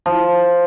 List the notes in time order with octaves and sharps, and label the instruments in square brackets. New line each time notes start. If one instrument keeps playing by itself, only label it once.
[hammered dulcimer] F3